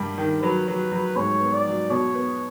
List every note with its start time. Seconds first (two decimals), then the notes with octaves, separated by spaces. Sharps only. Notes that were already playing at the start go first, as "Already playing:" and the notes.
Already playing: G2 G3 A#3
0.18 D#3
0.42 F#3 B4
0.67 F#3
0.92 F#3
1.16 G#2 C#5
1.40 B3
1.53 D5
1.66 F#3
1.90 B2 C#5
2.15 B3